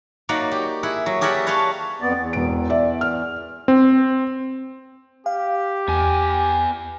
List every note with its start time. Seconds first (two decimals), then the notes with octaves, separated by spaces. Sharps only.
0.29 F#3 A#3 D#4 D5 F#5
0.51 G4
0.83 E4 G#4 F#5
1.06 F#3
1.21 G4 G#4 A#4 D5 E5 F#5
1.47 B4 C#5 F5 A5 C6
2.01 F2 B3 D5
2.15 E2
2.33 E1 D7
2.70 D5 E5
3.01 F6
3.68 C4
5.26 G4 F5
5.88 E2 B3 G#5